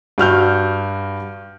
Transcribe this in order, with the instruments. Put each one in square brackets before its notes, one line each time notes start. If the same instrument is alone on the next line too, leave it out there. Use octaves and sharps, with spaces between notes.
[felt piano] G2 F#4 F6 G6